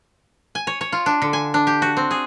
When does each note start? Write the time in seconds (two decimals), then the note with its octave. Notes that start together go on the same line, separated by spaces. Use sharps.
0.55 G#5
0.67 C#5
0.81 C#5
0.92 F4
1.06 D4
1.22 D3
1.33 G#5
1.54 D4
1.67 G4
1.82 F#4
1.97 C4
2.11 G#4